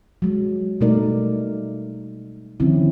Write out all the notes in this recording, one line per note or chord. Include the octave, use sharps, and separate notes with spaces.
F#3 G#3
B2 G3 A3 D#4 A#4 D5
D3 D#3 F3 C4 C#4 E4